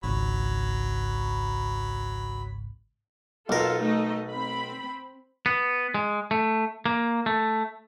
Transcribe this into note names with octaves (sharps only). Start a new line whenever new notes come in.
G#1 C#2 F#3 B5
B1 F4 A4 A#4
A3 D#4 D#5
C4 B5
B3
G#3
A3
A#3
A3